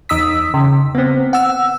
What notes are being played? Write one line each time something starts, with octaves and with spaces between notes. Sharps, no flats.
E2 D#4 D#6 E6 B6
C#3
B3 C4
F#5 E6